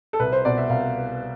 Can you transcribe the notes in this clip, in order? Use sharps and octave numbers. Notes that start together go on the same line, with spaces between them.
A4
C2 B4
C5
B2 D5
E5
C2 F5